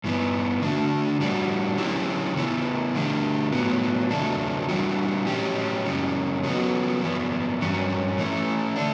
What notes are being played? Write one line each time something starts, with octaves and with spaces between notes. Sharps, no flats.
G2 E3 B3
D3 A3 D4 F#4
A2 G3 D4 F#4
D3 F#3 C#4 E4 G4
C#3 E3 B3 E4
D3 A3 D4 G4
A2 F#3 B3
E2 C#3 F#3 A3 D4
E3 G3 D4 F#4
A2 F#3 C#4 G4
F#2 C#3 G3 C#4
C#3 F#3 B3 F#4
F#2 E3 B3
G2 F#3 C#4
E3 A3 C#4
D3 A3 D4